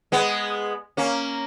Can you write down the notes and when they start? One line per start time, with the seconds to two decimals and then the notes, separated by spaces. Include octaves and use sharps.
0.12 G#3 B3
0.97 A#3 C#4